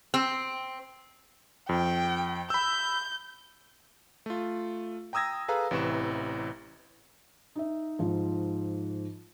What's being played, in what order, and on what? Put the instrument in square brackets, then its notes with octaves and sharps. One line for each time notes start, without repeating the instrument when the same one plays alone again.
[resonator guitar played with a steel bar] C4
[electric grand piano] F2 [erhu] G5
[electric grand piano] B5 E6 [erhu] G6
[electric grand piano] A3 F4
G5 A#5 D#6 E6 G#6 A#6
G#4 A4 B4 F5 A#5
A1 C3 E3 C#6 E7
[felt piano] D#4 E5
G#2 F3